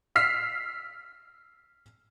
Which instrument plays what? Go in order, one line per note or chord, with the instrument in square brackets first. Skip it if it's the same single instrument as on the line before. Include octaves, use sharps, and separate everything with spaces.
[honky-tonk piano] E6 F6 B6 C7